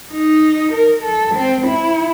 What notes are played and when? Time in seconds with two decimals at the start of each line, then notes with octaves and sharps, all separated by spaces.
0.12 D#4
0.72 A#4
1.04 A4
1.35 C4
1.67 E4